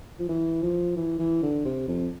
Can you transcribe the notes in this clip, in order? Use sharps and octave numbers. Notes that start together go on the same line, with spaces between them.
F3
E3
F3
E3
E3
D3
C3
F2